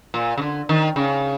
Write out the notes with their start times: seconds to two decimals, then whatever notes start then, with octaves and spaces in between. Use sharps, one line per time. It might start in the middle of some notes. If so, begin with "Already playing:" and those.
0.14 A#2
0.38 C#3
0.42 D3
0.69 D#3
0.96 C#3